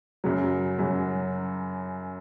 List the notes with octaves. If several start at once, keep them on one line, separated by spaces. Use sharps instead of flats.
F#2 C#3 F#3
F#2 C#3 F#3